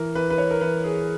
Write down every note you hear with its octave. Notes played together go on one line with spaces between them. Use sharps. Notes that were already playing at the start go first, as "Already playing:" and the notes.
Already playing: E3 A#4
E3 B4
B4
C#5
A#4
E3 B4
G#4